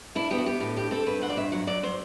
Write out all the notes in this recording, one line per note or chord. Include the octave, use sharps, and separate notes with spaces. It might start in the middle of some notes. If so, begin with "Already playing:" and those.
D4 E4
B3 G4
F#4
B3 G4
A2
G2 G4
C4 A4
G2 B4
C4 F#5
D5
G2 E5
F#3 F#5
F#3 D5
F#3 C5